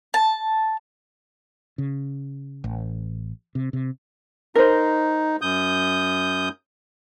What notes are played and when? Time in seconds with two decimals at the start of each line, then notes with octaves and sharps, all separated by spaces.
0.14 A5
1.78 C#3
2.64 A1
3.55 C3
3.73 C3
4.55 D#4 A#4 C5
5.42 F#2 D#6 G6